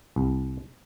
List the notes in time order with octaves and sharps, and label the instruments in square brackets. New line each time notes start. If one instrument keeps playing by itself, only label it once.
[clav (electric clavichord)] C2